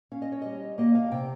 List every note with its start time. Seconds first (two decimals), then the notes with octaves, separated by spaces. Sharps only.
0.12 C#4 F5
0.22 D#5
0.32 C#5
0.42 G3 D#5
0.78 A#3 D#5
0.95 F5
1.11 C3 G5